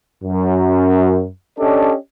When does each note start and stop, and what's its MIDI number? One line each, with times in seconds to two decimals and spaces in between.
0.24 1.26 42
1.59 1.94 61
1.59 1.94 62
1.59 1.94 67
1.59 1.94 69
1.59 1.94 74
1.59 1.94 75